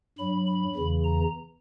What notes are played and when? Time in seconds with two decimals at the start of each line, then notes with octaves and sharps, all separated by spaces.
0.18 G2 F#3 B5
0.47 B5
0.75 E2 C#3 E3
1.04 A#5